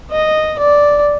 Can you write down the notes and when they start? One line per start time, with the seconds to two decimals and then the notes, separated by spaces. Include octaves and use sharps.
0.11 D#5
0.59 D5